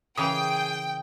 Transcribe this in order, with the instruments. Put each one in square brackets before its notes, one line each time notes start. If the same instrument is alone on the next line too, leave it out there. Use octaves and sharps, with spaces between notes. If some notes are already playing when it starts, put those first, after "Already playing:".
[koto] C#3 E3 A#4 [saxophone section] G#4 [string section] G5 [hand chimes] D#6